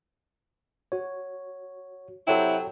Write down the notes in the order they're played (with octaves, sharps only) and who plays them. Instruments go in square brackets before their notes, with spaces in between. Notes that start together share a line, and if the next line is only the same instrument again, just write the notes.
[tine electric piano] F#4 C#5
[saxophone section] C3 F#3 E4 [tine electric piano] A4 C#5 G5